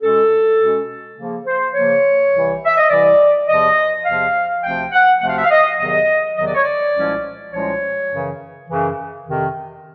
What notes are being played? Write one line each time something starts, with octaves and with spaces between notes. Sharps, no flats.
B2 G#3 C#4 A4
B2 G#3 C#4
C#3 F3 A#3
C5
C#3 F3 A#3 C#5
C2 C3 E3
E5
D#5
C2 C3 E3 D5
E2 C3 F3 D#5
E2 C3 F3 F5
D2 C3 F3 A3 C4 G5
F#5
D2 C3 F3 A3 C4 F#5
F5
E5
F5
D#5
E2 C3 D#3 F#3 D#5
E2 C3 D#3 F#3 D#5
D5
C#5
D5
C2 A#2 F3 G#3 C#4
C2 A#2 F3 G#3 C#4 C#5
F#2 C#3 E3
F#2 C#3 E3
F2 C3 D#3